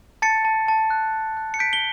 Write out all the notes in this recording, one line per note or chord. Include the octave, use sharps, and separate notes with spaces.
A5 A6 C#7
A5
A5
F#6
F#6
F#6
C#7
G6 B6 D7
G7